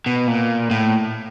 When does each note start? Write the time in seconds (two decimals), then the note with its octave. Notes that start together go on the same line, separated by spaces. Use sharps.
0.06 B2
0.28 A#2
0.71 A2